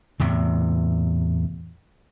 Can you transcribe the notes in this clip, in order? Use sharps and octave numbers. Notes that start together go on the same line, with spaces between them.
E2 A2 C3